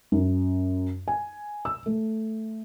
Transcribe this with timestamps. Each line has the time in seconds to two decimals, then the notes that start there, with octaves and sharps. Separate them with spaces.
0.12 F#2
1.08 G#5
1.65 E6
1.86 A3